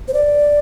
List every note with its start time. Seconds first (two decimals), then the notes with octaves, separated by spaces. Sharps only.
0.08 C5
0.14 D5